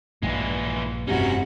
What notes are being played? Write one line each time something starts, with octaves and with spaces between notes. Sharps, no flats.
A#1 G2 E3 G#3
F1 G2 C3 G3 C#4 D#4 E4 F#4